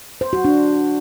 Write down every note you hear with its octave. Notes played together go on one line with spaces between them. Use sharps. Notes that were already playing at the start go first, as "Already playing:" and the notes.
C5
F#4
D4